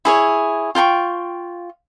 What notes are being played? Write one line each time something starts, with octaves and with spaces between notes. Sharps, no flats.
E4 G#4 C#5
F4 G5 A#5 C#6